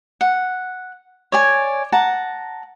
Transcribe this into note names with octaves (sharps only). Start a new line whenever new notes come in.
F#5
C#5 D5 G#5
F#5 A5 A#5